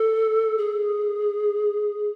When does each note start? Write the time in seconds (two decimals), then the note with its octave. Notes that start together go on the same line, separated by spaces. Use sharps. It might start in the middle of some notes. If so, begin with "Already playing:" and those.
Already playing: A4
0.58 G#4